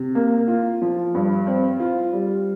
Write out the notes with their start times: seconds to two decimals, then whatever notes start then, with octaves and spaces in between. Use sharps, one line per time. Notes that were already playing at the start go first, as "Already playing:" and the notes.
Already playing: C3
0.15 A#3
0.48 F4
0.82 F3
1.15 G2
1.47 C4
1.80 F4
2.13 G3